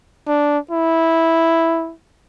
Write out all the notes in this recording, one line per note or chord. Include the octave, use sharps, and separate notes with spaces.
D4
E4